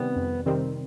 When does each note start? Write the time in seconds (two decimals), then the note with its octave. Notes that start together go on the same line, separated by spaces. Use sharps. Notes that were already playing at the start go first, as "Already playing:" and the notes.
Already playing: C3 D#3 G3 B3 C4
0.16 F2
0.46 C3 D#3 G3 C4